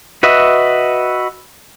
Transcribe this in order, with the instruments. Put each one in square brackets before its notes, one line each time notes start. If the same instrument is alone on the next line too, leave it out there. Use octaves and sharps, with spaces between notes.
[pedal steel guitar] F#4 B4 D#5 E5